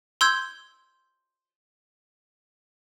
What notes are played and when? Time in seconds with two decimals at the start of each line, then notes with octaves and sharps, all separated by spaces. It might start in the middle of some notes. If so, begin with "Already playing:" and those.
0.21 C6 E6 G6 G#6